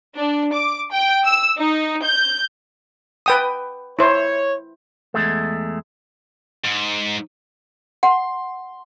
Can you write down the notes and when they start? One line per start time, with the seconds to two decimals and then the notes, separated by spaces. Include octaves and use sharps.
0.17 D4
0.55 D6
0.92 G5
1.25 E6
1.58 D#4
2.04 G6
3.26 B4 G5 D#6
3.99 E4 C5 C#5
5.14 E2 G#2 G#3 A3
6.64 G#2
8.03 F#5 C6